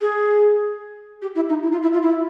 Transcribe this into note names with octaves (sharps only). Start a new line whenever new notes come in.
G#4
G4
E4
D#4
E4
F4
E4
F4
E4